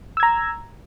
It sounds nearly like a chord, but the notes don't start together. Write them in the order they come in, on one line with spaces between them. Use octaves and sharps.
E6 G#6 A#5